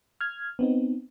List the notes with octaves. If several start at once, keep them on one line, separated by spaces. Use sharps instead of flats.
F6 G#6
B3 C4 D#4